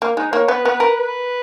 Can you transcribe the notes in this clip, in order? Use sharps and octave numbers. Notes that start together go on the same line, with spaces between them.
A#3
G#3 D#4
A#3 C#5
B3 B4
B3 B4
A#4
B4